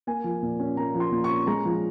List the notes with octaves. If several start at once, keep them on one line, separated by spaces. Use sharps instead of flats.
A#3 G#5
F3
A#2
C#4
A#3 A#5
F3
C6
A#2
C#6
C#4
G#3 A#5
F3